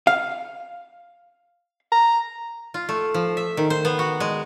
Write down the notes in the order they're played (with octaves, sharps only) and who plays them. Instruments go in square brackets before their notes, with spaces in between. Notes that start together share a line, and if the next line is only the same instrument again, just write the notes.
[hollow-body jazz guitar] F5
[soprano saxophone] A#5
[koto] F4
A3
F3
E5
D#3
C5
B3
F#4
G#3